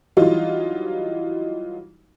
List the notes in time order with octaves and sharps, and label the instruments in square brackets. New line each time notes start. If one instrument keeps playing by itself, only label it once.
[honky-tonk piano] E3 F#3 G3 D#4 F4